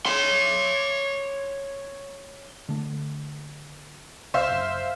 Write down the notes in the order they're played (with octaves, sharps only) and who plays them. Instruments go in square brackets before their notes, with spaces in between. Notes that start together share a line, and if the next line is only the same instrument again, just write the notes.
[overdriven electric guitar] C#5 C6
[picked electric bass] D3 A3
[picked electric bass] C2 [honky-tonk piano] C5 E5 F5
[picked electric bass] F#1